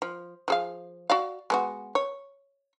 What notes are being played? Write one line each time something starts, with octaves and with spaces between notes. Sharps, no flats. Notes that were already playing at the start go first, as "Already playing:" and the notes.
F3
F3 G#4 F5
F#4 D5 F5
G#3 B3 F#4
C#5